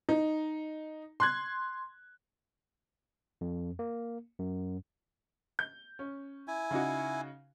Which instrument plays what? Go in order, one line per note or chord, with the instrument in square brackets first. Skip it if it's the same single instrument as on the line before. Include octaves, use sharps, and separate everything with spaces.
[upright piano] D#4
C6 F#6 G#6
[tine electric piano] F2
A#3
F#2
[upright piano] G6
C#4
[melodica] E4 G#5
[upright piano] C#3 D#4 F#4